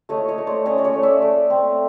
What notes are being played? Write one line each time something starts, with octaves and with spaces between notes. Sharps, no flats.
A3 C#5 D#5
C#5 D#5
A3
C5 D5
C#4 C#5 D#5
D5
C#5 D#5
A3
D5 E5
A3
C4